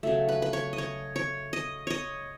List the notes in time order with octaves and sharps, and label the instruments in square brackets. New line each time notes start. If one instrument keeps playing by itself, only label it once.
[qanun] C#3 F#3 A3
B4
B4
C#5
D#5
C#5
C#5
D#5
C#5 D#5